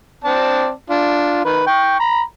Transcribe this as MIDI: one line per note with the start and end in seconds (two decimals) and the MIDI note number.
0.24 0.70 60
0.24 0.70 74
0.24 0.70 81
0.90 1.42 62
0.90 1.42 65
1.45 1.65 51
1.45 1.65 71
1.67 1.99 79
1.67 1.99 85
2.00 2.21 82
2.00 2.21 83